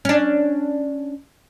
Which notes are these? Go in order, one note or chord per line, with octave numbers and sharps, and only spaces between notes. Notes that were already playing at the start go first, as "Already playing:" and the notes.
C#4 D4